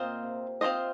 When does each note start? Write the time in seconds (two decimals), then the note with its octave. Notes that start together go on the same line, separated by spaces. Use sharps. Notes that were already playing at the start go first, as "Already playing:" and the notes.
Already playing: A#2 C4 F4 C5 D#5
0.23 C3
0.61 C3 C4 F4 G#4 C5 D#5